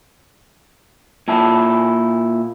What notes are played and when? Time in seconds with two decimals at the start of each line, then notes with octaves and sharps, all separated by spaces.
1.28 A#2 E4 A5